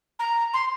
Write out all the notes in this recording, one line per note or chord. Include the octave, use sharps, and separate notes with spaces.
A#5
C6